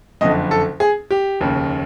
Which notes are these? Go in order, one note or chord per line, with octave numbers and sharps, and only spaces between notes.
F#1 F2 D3 D#5
A4
G#4
G4
F1 D#2 C#3